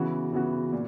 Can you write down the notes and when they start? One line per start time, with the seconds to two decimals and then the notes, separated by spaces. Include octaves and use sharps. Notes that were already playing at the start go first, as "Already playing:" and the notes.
Already playing: C#3 E3 B3 F#4
0.32 C#3 E3 B3 F#4
0.72 A#2